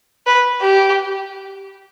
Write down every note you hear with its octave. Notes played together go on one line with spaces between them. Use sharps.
B4
G4